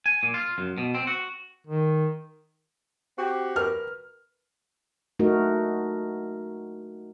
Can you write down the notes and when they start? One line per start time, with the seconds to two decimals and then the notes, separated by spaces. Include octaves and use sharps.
0.06 G#5
0.23 A#2
0.34 F4
0.58 F#2
0.78 B2
0.95 C4
1.07 F#4
1.67 D#3
3.18 C4 F#4 G4
3.56 A#4 B4 F6
5.19 A3 D#4 F#4 A#4